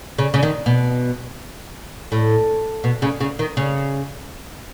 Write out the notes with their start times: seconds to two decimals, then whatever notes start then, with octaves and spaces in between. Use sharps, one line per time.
0.18 C#3
0.34 C#3
0.43 D#3
0.66 B2
2.12 A2
2.84 B2
3.02 C#3
3.21 C#3
3.39 D#3
3.57 C#3